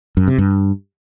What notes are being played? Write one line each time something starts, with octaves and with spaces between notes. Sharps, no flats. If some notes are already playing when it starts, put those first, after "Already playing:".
F#2
C3
G2